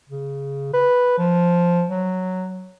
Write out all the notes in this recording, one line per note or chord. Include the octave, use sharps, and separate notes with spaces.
C#3
B4
F3
F#3